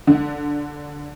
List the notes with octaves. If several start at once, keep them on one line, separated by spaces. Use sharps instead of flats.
D3